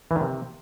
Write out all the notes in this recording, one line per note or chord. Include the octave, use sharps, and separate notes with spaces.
E3
D#3
C3